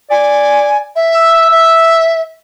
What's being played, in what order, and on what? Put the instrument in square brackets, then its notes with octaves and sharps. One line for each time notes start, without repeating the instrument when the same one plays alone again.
[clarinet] D5 [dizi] G#5
[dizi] E5
[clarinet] E6
[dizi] E5